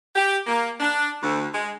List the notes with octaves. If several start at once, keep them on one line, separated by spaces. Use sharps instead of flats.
G4
A#3
D4
D2
G#3